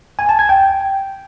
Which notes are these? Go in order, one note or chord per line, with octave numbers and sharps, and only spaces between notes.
G#5
A5
G#6
G5